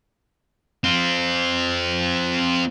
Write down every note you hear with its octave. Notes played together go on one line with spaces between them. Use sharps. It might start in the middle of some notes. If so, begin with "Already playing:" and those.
C4 F4